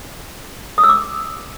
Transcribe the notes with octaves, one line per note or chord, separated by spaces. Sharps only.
D#6
E6
D6